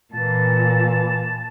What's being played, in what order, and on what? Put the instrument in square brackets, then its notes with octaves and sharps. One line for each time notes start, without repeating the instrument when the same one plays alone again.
[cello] A#2 [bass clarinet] E3 [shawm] A5